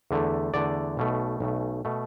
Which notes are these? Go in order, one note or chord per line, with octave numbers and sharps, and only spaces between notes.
E2 D3 A3
E2 D3 A3 D5
B1 B2 A3
B1 B2 A3
B2 A3